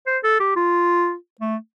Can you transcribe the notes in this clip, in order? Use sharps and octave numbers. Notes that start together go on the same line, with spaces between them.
C5
A4
G4
F4
A3